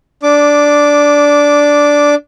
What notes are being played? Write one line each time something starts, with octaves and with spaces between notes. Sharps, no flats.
D4 D6